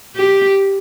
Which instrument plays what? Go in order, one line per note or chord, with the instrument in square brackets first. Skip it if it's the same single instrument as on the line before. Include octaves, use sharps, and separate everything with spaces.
[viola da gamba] G4